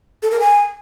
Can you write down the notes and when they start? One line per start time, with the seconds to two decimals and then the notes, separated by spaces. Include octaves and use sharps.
0.23 A4
0.31 A#4
0.40 G#5